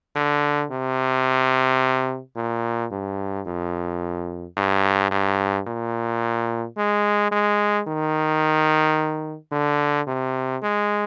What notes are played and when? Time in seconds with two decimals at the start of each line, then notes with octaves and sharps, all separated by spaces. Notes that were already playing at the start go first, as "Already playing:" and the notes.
0.16 D3
0.71 C3
2.36 A#2
2.91 G2
3.46 F2
4.57 G2
5.11 G2
5.67 A#2
6.77 G#3
7.31 G#3
7.87 D#3
9.52 D3
10.07 C3
10.62 G#3